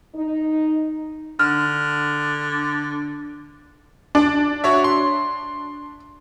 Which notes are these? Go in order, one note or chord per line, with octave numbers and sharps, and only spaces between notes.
D#4
D3 F6
D4
F#4 C#5 E5
C6